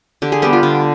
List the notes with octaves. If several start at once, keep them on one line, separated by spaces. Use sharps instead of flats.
D3 G4
G#4
G3 B3 G4
F4
D3